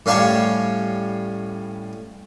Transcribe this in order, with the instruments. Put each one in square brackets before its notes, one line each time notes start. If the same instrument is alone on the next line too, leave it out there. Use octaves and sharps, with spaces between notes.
[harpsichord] A2 G3 C#4 F5 A5 C#6